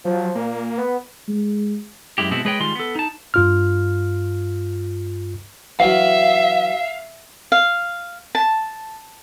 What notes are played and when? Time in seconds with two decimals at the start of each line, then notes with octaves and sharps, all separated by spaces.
0.05 F3 F#3
0.35 A#2 A#3
0.78 B3
1.28 G#3
2.18 F#2 G#3 E4 G4
2.31 B2 G#3 B3 C4 E4
2.45 G#3 G#4 B4 C#5 D#5 G5
2.60 D#3 G3 G#3 F4 C6
2.75 B3 A4
2.95 D#4 A5
3.34 G2 F4 F6
5.80 E3 F#3 E5 F5
7.52 F5
8.35 A5